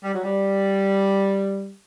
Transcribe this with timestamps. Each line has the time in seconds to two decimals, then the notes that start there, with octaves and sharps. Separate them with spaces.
0.04 G3
0.15 F#3
0.24 G3